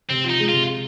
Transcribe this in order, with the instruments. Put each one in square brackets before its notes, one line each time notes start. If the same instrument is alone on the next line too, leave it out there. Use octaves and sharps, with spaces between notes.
[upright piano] C3 [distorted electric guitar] C4
[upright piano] F3
[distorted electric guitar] D#4
[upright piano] G#3
[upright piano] C3 [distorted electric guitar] F4